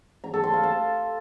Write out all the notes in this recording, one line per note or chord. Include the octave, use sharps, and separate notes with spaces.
A#5
A4
C6
F5
A5